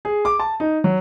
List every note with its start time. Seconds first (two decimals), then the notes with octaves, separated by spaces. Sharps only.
0.05 G#4
0.25 D6
0.39 A5
0.60 D#4
0.84 F#3